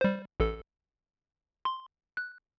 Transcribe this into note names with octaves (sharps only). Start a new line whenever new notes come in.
G3 C5
A1 A4
C6
F#6